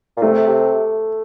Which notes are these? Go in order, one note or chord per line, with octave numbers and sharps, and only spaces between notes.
A#2
C3 A3
C3